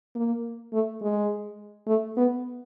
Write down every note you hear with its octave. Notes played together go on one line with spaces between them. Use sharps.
A#3
A3
G#3
A3
B3